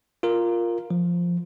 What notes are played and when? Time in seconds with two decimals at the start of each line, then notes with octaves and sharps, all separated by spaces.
0.23 F4 A#4
0.91 F3